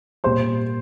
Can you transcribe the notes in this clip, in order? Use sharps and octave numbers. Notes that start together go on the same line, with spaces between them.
A#2 G3 C5 C6